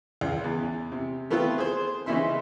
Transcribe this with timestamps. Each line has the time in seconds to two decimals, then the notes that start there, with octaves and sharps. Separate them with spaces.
0.21 C#2
0.44 E2
0.92 C3
1.31 A3 B3 C4 E4 F4
1.58 G#4 C5
2.06 C#3 E3 D#4 E4 E5 C6